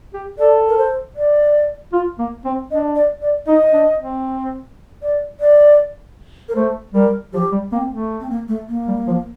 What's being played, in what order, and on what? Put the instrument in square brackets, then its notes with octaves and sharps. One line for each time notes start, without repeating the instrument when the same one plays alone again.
[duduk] G4
[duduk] A4 [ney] D5
[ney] A#4
C5
D5
[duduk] F4
A#3
C4
[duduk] D4 [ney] D#5
[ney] D5
D5
[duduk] D#4 [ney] D#5
[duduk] D4
C4
[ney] D5
D5
A#4
[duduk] A3 [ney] C5
[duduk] G3 [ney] A#4
[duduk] F3 [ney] G4
[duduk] G3
[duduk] A#3 [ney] C4
[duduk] A3
[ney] C4
A#3
A3
A#3
[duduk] G3
F3